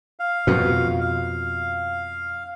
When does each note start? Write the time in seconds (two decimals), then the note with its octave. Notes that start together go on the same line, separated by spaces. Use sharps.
0.19 F5
0.47 F2 B2
1.01 F5